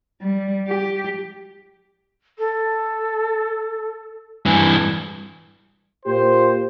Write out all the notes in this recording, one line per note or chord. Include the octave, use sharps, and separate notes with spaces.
G3
G4
A4
G2 E3 G#5
A#2 F4 G4 C5